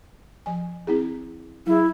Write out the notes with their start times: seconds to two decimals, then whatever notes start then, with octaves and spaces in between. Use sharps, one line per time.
0.46 F3 G#5
0.87 C4 E4 G#4
1.67 F#3 E4 G#4